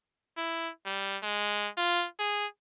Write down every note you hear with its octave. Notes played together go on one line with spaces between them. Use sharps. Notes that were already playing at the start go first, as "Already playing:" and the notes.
E4
G3
G#3
F4
G#4